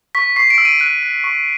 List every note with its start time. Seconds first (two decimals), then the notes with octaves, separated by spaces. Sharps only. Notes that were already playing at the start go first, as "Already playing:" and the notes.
0.15 C#6 B6
0.36 C#6 C7
0.50 D7
0.58 E6
0.65 D#7
0.80 F#6 D#7
1.03 F#6
1.24 C#6